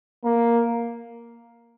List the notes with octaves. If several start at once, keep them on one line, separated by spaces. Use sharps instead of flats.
A#3